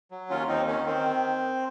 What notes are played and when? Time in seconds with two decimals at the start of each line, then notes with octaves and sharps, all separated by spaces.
0.11 F#3
0.30 D#2 C#4 F4
0.48 D#2 C4 D#4
0.67 D#3 C#4
0.86 D#3 C4